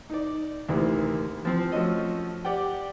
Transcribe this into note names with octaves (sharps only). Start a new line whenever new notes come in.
D#4 D5
D2 C3 D#3 E3 A#3
E3 F3 C4
F3 A3 C#4 F#4 A4 D#5
G4 D5 F#5 G5